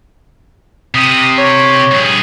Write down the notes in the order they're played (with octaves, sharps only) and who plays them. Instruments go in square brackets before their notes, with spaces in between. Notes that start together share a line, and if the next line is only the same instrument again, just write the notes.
[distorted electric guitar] C3 [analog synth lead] D#6
[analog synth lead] C#5
[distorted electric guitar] G2 G#4